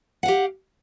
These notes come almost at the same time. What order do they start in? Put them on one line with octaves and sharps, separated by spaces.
F#5 F5 G4